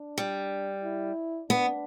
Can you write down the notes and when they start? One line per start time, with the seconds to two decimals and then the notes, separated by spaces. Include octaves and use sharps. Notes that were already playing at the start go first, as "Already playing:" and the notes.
Already playing: D4
0.18 G3
0.83 E4
1.50 B3 D4